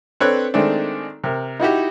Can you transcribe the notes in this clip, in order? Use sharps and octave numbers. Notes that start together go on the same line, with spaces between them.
C4 D4 A4 B4 C#5 F#6
D#3 G#3 A3 C4 D4
C3 A#4
D#4 E4 F#4 G4